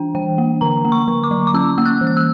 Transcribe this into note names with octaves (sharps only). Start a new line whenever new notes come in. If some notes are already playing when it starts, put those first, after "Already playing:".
Already playing: E3 D4 G5
E3 G5
A#3
D3 A#5
A#3
C#6
D3
D6
F#3
D6
C#4 E6
A#3 E6
F#6
E3
F#6
E6